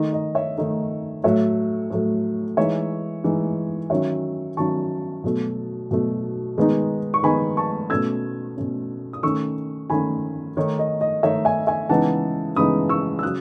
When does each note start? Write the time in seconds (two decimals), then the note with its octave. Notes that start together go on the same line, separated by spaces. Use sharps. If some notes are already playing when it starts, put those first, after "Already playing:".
Already playing: D#3 A3 D#4 D#5
0.13 D#5
0.35 C#5 E5
0.58 D#3 A3 D#4 D#5
1.24 A2 F#3 A3 C#5 E5
1.90 A2 F#3 A3
2.57 E3 G#3 D#4 C#5 E5
3.24 E3 G#3 D#4
3.90 D#3 F#3 C#4 C#5 E5
4.57 D#3 F#3 C#4 A5 C#6
5.24 B2 F#3 A3
5.91 B2 F#3 A3
6.57 D#3 G#3 B3 D#4
7.14 C#6
7.23 D#3 G#3 B3 D#4 G#5 B5
7.57 A5 C#6
7.90 B2 A3 C#4 E6 G#6
8.57 B2 A3 C#4
9.13 D#6
9.23 D#3 A3 C#4 C#6 E6
9.90 D#3 A3 C#4 G#5 B5
10.57 D#3 A3 D#4 C#5
10.79 D#5
11.01 D#5
11.23 D#3 A3 D#4 C#5 E5
11.45 E5 G#5
11.67 E5 G#5
11.89 C#3 E3 G#3 B3 D#4 F#5 A5
12.56 C#3 E3 G#3 B3 D#4 B5 D#6
12.89 C#6 E6
13.19 E6
13.23 C#3 F#3 D#6 F#6